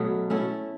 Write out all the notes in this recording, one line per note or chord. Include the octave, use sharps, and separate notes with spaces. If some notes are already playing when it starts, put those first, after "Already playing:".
Already playing: B2 F#3 A3
A3 C#4 E4 A4